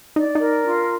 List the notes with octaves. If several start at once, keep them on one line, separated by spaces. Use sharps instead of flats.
D#4 D5
D#4 A#4
D4 F4